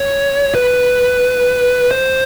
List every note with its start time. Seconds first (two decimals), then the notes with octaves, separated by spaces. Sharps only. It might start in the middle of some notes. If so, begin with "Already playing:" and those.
Already playing: C#5
0.55 B4
1.91 C5